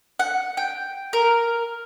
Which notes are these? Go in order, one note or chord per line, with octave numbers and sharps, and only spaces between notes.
F#5
G5
A#4